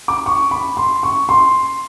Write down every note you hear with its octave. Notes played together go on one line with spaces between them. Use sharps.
D6
C#6
B5
C6
C#6
C6